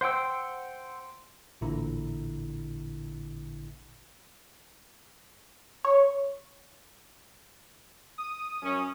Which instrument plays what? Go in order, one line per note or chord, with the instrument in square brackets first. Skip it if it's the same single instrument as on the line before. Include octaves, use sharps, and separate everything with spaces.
[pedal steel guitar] C5 F#5 G5 E6
[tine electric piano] A1 A#2 D3 E4 A#5
[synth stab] C#5
[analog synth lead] D#6
[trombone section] F#2 C#4